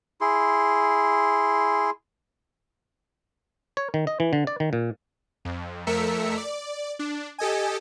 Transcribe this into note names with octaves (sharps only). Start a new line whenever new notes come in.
E4 G#4 C6
C#5
D#3
D#5
E3
D3
D5
D#3
A#2
F2
F2 A3 A#4 E6 B6 C#7
D5
D4
G4 A4 D#5 G#5